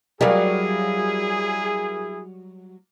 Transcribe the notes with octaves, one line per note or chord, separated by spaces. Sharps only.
F#3 G3 E4 G#4 A#4 D5 F5